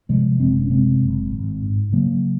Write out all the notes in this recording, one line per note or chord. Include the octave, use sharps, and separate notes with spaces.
C3 F3 G#3
F#1 G#3 C4
C#4
C3 G#3 C4
F#1
G#1
G#2
C#3 F#3 A#3